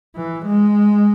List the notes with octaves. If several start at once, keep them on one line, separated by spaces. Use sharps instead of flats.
E3
G#3